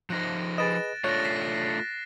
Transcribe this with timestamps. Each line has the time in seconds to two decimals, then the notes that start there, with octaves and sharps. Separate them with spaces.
0.10 F3 D#4 C5 F#6 A#6
0.58 G#4 B4 D#5 A6 D7 E7
1.04 A3 D4 F4 C#5 F#6 A#6
1.23 B6 C7 E7